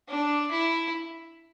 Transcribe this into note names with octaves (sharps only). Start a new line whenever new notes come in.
D4
E4